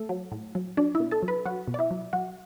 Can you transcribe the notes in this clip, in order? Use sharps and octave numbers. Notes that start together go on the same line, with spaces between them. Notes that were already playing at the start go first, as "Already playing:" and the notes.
Already playing: A3 A4
F#3
A2
F#3
F#3 D4 D5
E4 E5
B2
A4 A5
F#3
B4 B5
F#3 F#4 F#5
B2
D5
E4 E5
F#3
F#3 F#4 F#5